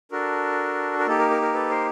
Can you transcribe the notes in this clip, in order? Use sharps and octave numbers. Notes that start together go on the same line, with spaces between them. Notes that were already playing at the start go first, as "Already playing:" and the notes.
D4 F#4 A4 A#4
A#4
A#3 D#4 G4 A4
A#4
A#4
A#4
A4 B4
A#4 C5